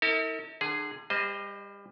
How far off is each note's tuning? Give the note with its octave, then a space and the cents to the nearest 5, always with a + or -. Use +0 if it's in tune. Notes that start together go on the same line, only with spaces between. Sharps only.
E4 -45 A#4 -45
D3 +35 G#4 +0
G3 +30 C5 -15 D#5 -5